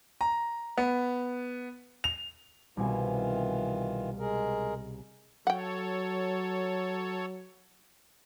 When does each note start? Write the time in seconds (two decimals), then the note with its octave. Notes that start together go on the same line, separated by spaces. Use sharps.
0.21 A#5
0.78 B3
2.04 F7
2.77 C2 B2 D#3 E3 F4 G#5
4.19 G#3 G#4 A#4
5.47 F#3 A4 C#5 F#5 G5